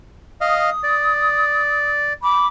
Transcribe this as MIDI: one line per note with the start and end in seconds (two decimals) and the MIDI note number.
0.41 0.70 75
0.41 0.70 77
0.41 1.87 87
0.83 2.13 74
2.22 2.45 83
2.22 2.45 86